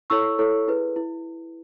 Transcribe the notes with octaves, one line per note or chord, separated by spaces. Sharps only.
E4 A4 C#5 C#6 E6
E4 A4 C#5
E4 G#4 B4
E4